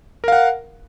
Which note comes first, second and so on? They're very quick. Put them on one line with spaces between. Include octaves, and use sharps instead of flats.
A#4 F5 F#5